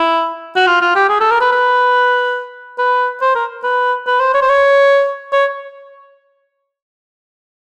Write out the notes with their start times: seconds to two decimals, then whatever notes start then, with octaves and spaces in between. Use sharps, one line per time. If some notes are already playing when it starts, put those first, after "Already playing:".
Already playing: E4
0.56 F#4
0.67 F4
0.81 F4
0.96 G4
1.09 G#4
1.21 A4
1.31 A#4
1.41 B4
1.52 B4
2.79 B4
3.22 C5
3.35 A#4
3.64 B4
4.07 B4
4.20 C5
4.34 C#5
4.42 C5
4.50 C#5
5.33 C#5